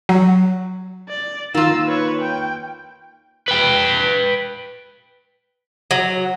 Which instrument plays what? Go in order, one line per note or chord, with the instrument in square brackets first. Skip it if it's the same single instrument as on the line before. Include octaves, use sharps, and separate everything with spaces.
[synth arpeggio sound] F#3
[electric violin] D5
[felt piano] D#3 [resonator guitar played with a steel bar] A#3 F4 [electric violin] E6 A6
[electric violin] B4 C#5
G5
[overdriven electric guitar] B4 G5
[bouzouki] F#3